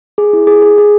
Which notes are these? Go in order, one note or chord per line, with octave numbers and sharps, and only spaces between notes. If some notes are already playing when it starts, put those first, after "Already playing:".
G#4
E4
G#4
G#4
G#4